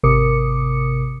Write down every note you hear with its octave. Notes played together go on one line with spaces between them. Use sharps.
G#1 C3 A#4 D6 D#6 C#7